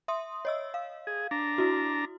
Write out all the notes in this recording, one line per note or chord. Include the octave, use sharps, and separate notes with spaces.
E5 C6 D#6
C#5 D#5 E6
F5
G#4
D4 A#5
E4 F#4